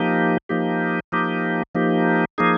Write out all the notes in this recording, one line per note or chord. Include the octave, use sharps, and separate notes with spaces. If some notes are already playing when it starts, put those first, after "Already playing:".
Already playing: F3 A#3 D#4 G4
F3 A#3 D#4 G4
F3 A#3 D#4 G4
F3 A#3 D#4 G4
F3 A#3 D#4 G#4